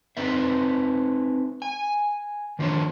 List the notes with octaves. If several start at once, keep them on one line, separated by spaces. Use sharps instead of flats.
C4 D#4 B4 E5
G#5
D#3 F3 A#3 D4 C#5